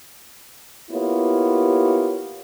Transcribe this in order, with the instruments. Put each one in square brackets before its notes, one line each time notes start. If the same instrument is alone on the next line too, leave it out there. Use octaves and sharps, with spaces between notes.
[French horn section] A#3 B3 E4 F4 G4 C#5